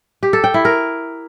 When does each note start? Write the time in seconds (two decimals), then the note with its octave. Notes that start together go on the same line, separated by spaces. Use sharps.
0.23 G4
0.33 A4
0.44 G5
0.54 E4
0.65 A#4